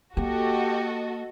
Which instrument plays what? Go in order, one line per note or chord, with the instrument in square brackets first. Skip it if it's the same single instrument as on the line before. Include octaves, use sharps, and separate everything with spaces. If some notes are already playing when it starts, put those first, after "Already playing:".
[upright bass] A#3 [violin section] F#4 A4 D#5 [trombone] G4